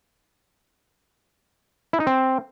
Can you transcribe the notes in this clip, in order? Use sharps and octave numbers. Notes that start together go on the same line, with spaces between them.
E4
D#4
C4